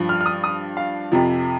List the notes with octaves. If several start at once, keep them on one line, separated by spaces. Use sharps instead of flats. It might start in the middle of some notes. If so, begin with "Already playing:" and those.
Already playing: G2 F3
F6
F6
D#6
D#6
F5
F2 C3 F3